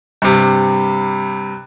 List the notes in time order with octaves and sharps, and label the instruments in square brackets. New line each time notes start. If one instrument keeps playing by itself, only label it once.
[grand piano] G2 C3